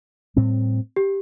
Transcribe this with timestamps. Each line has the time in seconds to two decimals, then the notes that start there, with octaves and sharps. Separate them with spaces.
0.36 A2 G3 C4
0.96 G4